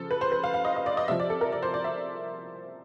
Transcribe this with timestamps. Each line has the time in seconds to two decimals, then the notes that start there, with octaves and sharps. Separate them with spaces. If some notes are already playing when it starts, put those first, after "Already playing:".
Already playing: C#3 F3 A4
0.11 B4
0.21 C5
0.32 B4
0.44 F5
0.54 F5
0.65 D#5
0.76 D#5
0.86 D5
0.97 D#5
1.08 C3 F3 E5
1.20 D5
1.30 A4
1.41 A#4
1.52 D5
1.63 C5
1.74 D5
1.84 E5